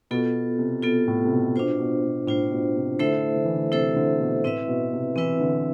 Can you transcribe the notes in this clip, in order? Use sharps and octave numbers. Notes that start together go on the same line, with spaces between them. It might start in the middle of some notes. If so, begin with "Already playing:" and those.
B2 B3 F4 A4
C3
B2 B3 F4 A4
A2
C3
B2
B2 D4 F4 C5
B2
B2
A2 D4 F4 C5
B2
C3
D3 A3 E4 A4 C5 E5
D3
E3
D3
C3 A3 E4 A4 C5 E5
D3
B2
A2 C4 E4 B4 E5
B2
C3
E3 C4 E4 B4 E5
D3